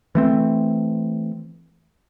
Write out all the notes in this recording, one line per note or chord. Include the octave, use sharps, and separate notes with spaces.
E3 A3 C4